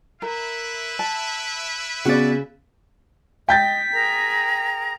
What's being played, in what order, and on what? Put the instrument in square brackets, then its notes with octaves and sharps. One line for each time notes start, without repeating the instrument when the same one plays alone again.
[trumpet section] E4 B4 E5 [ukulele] A#4
[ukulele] A5
[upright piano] C#3 [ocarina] B3 [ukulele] F#4 D5
[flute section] D#5 [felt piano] G5 G6 A6 [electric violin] B6
[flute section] G#4 A#4 A#5